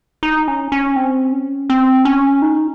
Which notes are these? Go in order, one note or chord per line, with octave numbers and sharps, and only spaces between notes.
D#4
C#4
C#4
C4
C#4
C4
C#4
D#4